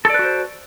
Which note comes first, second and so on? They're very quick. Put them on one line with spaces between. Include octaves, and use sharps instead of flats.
A4 D5 B4 F#4 C5